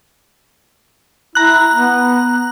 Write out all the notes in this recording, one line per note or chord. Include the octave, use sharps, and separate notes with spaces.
E4 A#5 F#6
B3